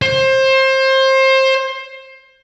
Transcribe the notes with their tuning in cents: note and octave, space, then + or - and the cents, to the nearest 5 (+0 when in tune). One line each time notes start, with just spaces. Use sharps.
C5 +25